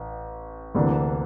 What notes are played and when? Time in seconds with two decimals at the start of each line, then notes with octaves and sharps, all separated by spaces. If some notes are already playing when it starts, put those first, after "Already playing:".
Already playing: A1
0.75 D2 C3 E3 A#3 D4